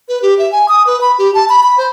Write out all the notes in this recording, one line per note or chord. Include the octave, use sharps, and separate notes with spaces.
B4
G4
E5
G#5
D#6
B4
B5
G4
A5
B5
B5
C5